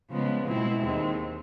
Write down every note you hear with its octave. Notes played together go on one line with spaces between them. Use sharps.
C#3 F3 G#3 B3
B2 G#3 C4 E4
D#2 D#3 G#3 C4